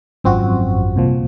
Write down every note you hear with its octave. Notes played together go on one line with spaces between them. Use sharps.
G#1 F#2 F3 C4 F#4
C2 A#2 F3